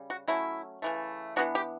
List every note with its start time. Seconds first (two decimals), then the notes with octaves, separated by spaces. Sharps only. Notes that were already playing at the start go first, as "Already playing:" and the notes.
Already playing: C#3 G3
0.10 F#4
0.28 F#3 A3 C#4 E4
0.82 C#3 E3 A3
1.36 E3 B3 D4 F#4
1.55 G4